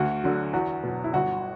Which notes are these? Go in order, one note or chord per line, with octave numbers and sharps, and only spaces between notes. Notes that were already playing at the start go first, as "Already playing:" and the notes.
Already playing: D2 F#4
D3 F#3
E2 F#4
B2 F#3
E4
G1 F#4